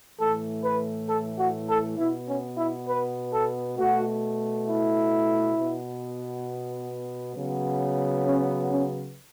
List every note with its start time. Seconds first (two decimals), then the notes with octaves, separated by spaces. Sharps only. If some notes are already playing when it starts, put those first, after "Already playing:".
0.19 A2 E3 A3 A4
0.64 B4
1.09 A4
1.39 F#4
1.69 A4
1.98 B2 B3 E4
2.29 C#4
2.58 E4
2.88 B4
3.32 A4
3.77 B2 A3 F#4
4.67 E4
5.56 B2 B3
7.35 C#3 F#3 B3
8.25 C#4
8.70 C#4